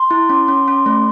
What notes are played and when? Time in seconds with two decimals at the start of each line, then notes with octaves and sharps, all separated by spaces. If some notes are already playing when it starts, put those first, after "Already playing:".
Already playing: C6
0.11 E4
0.30 C#4
0.48 C#4
0.68 C#4
0.86 A3